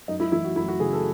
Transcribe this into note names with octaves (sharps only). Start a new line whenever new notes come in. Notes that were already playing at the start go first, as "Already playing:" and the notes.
F#2 D#4
E4
E3 E4
F#4
F#2 E4
F#4
C#3 G#4
A4